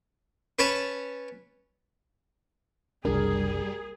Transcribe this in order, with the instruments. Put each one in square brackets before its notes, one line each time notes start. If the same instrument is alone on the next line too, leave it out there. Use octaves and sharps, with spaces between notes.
[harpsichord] C#4 B4 C#5 A5 B5
[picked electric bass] F#1 C2 D4 [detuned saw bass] G3 [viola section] G#4 [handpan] A#4